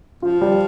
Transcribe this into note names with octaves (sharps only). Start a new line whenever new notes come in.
F3 F4
G3